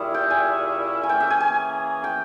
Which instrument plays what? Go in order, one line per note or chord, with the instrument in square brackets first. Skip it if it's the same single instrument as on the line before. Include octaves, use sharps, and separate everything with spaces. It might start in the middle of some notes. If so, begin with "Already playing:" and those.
Already playing: [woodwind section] A#2 G3 C#4 E4 G#4
[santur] G5
G#5
G#5
[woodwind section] E3 A#3 C#4 G#4 [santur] G5
[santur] E5
G#5
G#5
G5